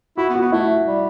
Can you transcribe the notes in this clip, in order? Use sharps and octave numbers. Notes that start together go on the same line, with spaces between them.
E4 F#4
B3
F#4
B3
A3 E4
G3